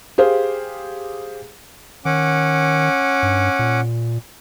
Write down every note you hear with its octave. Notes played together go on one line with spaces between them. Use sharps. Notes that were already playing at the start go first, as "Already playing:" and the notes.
G4 G#4 C5 F5
D#3 C#4 F#5 D6
G2
A#2